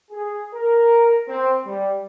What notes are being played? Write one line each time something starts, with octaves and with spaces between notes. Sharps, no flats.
G#4
A#4
C4
G3